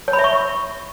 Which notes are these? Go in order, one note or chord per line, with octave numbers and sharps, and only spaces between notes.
C#5
B5
E5
C#6